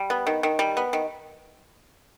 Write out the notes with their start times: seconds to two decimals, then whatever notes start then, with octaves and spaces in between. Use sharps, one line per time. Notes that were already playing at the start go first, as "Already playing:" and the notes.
Already playing: G3
0.10 B3
0.27 D#3
0.43 D#3
0.59 G3
0.77 B3
0.93 D#3